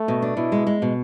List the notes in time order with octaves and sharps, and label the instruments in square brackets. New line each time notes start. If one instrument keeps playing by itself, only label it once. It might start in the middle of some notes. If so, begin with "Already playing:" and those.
Already playing: [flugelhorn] A3
[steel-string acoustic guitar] B2
D4
[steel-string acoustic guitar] B2 [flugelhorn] E4
[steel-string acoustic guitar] G#3
G#3
B2